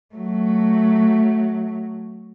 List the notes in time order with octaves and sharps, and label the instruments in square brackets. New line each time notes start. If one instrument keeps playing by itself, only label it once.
[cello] F#3 A3